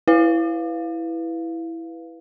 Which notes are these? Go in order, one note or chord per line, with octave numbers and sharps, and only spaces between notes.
E4 B4 F5